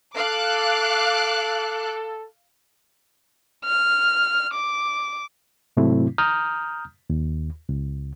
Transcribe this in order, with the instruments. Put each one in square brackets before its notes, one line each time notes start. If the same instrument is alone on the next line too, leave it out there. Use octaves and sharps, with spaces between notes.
[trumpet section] A4 [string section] F5 D6 F#6
[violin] F6
D6
[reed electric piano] G#2 C3 F#3 A3 C4 E4
A#5 D#6 F6 G6
D#2
C#2